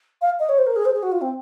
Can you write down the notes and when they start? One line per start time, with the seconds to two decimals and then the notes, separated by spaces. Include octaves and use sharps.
0.21 F5
0.39 D#5
0.49 C#5
0.58 C5
0.66 A#4
0.76 G#4
0.85 C5
0.93 G#4
1.02 F#4
1.11 F4
1.21 C4